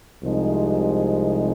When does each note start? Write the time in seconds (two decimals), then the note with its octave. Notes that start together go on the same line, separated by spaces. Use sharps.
0.23 C2 C3 F3 G#3 D#4